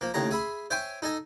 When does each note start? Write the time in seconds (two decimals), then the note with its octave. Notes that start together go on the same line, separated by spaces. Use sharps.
0.01 F3 A#3
0.14 D#2 A2 C#3 C#5 A#5
0.31 G#4 E5 B5 C6
0.70 C5 C#5 E5 G5 G#5 C6
1.02 D#4 A4 D#5 G#5